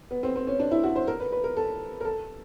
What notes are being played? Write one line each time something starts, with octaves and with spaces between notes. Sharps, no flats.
B3
C4
C4
C#4
D4
E4
F#4
C5
A#4
B4
B4
A#4
A4
A#4
A4